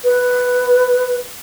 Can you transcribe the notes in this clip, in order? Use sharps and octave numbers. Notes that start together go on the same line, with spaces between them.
B4